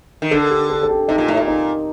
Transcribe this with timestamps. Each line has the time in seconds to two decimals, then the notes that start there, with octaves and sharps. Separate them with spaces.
0.22 D#3
0.31 D3 A4
0.50 G4
0.70 A4
0.83 A4
0.90 G4
1.08 C3 D#4
1.18 A#2
1.28 A2
1.37 A#2
1.47 D#4